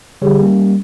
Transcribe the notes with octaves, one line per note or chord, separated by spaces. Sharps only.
D3 G3 G4 G#4 C#5
G3 A#3 C#4